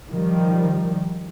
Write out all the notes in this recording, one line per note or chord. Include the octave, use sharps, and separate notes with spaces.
D#3 F3 G3